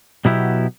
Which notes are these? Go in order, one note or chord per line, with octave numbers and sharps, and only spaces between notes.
B2 F#3 B3 E4 G4